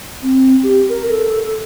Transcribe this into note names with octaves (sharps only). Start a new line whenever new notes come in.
C4
G4
A#4
A4